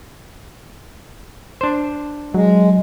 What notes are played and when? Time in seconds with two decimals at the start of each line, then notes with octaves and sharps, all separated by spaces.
1.61 D4 C5
2.34 F#3 G#3